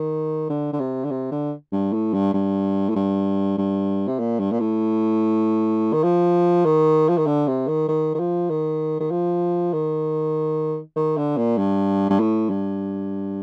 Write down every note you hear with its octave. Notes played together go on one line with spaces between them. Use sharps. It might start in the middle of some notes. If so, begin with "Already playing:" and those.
Already playing: D#3
D3
D3
C3
D3
C3
D3
G2
A2
G2
G2
A2
G2
G2
C3
A#2
G2
A#2
A2
D#3
F3
D#3
F3
D#3
D3
C3
D#3
D#3
D#3
F3
D#3
D#3
F3
D#3
D#3
D3
A#2
G2
G2
A2
G2